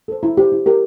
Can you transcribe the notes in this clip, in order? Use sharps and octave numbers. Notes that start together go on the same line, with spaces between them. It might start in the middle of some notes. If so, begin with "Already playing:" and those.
A4 C5
E4
G4 C5
E4
G4 A#4